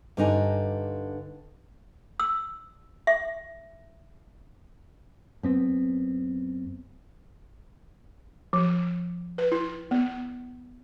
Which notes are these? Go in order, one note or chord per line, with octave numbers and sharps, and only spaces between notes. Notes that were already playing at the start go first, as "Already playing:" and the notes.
G2 D3 D#4 G#5
E6
E5
F#2 B3 C4
F3
B4
E4
B3